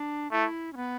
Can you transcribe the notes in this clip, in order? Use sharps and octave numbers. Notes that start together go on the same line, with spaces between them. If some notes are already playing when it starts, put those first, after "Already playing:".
Already playing: D4
A3 E4
C#4
B3